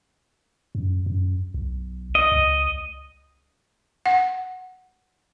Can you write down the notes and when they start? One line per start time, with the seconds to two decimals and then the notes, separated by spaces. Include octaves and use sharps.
0.75 F#2
1.06 F#2
1.54 B1
2.15 D#5
2.32 C#2
4.06 F#5